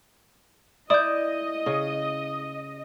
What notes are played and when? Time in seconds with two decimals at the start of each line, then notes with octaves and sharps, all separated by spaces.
0.90 E4 D5 D#5 D#6 G6
1.66 C#3